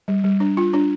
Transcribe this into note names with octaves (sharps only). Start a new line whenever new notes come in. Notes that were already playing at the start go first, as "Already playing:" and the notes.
G3
G3
D4
F4
D4